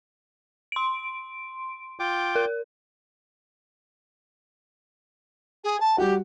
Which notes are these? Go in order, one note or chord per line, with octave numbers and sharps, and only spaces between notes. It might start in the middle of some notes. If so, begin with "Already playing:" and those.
C6 D7
F4 G5 D6
A#4
G#4
A5
G3 F#4 G4